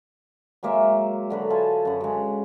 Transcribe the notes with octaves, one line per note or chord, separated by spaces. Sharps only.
F#3 G#3 A#3 E5
D3 F#3 B4
F4 A4 G#5 A5
F#2 F#5
C#3 G#3